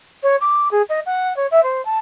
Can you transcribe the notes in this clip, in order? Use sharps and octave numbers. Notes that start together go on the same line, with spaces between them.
C#5
D6
G#4
D#5
F#5
C#5
E5
C5
A5